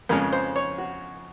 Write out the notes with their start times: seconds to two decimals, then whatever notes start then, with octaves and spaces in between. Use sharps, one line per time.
0.09 F2 C#3 G#3 C#4 A#4
0.33 C5
0.56 C#5
0.78 F#4